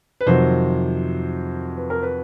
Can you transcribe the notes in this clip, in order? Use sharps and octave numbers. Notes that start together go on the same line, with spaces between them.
B4
F2 C3 D#3 F#3 C5
B4
A#4
B4